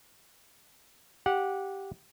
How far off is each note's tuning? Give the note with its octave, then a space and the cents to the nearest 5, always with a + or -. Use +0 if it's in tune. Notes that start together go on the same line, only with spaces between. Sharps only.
G4 -5 F#5 -15